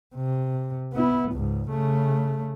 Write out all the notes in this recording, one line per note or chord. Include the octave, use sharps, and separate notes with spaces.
C3
B3 E4
C#2 G#2
C#3 A3